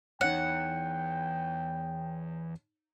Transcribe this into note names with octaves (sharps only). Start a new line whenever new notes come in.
E2 G2 D#4 C#5 F#5 G5